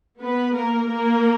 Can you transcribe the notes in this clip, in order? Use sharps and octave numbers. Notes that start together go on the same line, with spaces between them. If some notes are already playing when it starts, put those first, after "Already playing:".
B3 B4
A#3 A#4
A#3 A#4